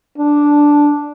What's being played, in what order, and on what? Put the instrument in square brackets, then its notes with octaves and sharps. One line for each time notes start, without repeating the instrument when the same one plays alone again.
[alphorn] D4